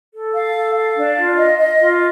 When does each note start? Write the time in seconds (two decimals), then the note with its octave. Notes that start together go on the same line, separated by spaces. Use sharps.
0.13 A4
0.35 F5
0.56 A4
0.76 F5
0.96 D4
1.18 F4
1.38 D#5
1.58 D#5
1.80 F4